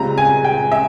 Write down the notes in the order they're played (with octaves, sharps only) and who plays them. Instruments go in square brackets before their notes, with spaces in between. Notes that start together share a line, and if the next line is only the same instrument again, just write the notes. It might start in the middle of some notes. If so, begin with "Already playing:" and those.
Already playing: [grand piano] C#2 C#3 G3 C4 F4 [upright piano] A#5
[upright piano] G#5
G5
E5